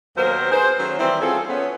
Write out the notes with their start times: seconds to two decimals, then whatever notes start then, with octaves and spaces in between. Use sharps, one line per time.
0.17 D#2 F#3 B3 A#4 C5
0.51 D#4 G#4 B4 C5
0.79 D#3 F#3 A3 C#4
0.99 D#3 E3 G3 C4
1.21 C4 C#4 E4 F4 G#4 A4
1.49 B3 C#4